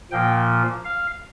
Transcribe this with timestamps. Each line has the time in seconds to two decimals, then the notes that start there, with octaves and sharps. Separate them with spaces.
0.11 A#2 F3 A#3 G5
0.84 F5